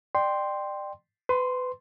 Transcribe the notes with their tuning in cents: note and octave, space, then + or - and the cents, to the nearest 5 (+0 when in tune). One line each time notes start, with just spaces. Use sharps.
D5 +30 G5 +0 C6 +0
B4 +30 C6 +0